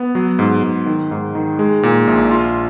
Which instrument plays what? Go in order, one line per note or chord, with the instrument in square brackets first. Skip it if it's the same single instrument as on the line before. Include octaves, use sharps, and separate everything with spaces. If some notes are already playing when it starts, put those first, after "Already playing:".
Already playing: [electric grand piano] B3
F#3
G#2
G#2
D#3
G#2
D#3
G#3
A#2
A#1
F4